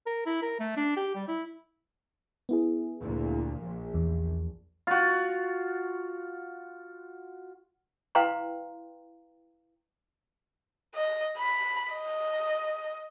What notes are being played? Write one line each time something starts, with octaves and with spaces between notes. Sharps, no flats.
A#4
E4
A#4
A3
D4
G4
G3
E4
B3 E4 G#4
D2 A#2
A#1
E2
F4 F#4
E4 B4 F5 G5 A#5 C6
D#5
B5
D#5